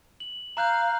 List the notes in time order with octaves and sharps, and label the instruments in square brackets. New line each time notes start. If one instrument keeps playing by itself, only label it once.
[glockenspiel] F#7
[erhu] F5 [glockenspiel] A#5 F#6 G6